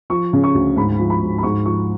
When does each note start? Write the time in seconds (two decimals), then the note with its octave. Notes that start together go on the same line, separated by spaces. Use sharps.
0.10 F3 C#6
0.33 C#3
0.44 C#6
0.54 D2
0.76 G#2 B5
0.99 F3
1.10 B5
1.22 G#2
1.38 B5
1.43 G#2 C#6
1.65 F3 C#6